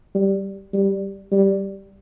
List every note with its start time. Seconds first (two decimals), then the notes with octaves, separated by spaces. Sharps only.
0.15 G3
0.73 G3
1.32 G3